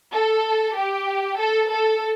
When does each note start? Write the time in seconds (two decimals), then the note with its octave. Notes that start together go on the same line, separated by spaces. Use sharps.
0.13 A4
0.76 G4
1.38 A4
1.70 A4